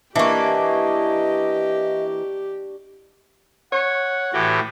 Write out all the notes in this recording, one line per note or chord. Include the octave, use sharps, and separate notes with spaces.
E3 A#3 D4 G4 D#5 C#6
C#5 F#5
A2 E3 F#4 G4